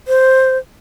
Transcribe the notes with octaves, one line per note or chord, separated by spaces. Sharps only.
C5